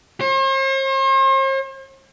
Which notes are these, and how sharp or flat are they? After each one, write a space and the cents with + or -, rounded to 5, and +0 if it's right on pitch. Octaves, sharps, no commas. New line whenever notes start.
C5 +45